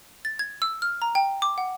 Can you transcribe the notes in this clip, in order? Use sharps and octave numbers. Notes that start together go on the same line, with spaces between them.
A6
G#6
E6
F6
A#5
G5
D6
F#5